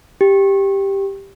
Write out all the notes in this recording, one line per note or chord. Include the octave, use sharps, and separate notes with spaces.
G4